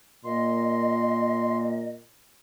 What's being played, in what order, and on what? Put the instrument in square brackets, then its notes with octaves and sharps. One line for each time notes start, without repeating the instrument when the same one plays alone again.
[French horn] A#2 [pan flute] D#5 [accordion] C6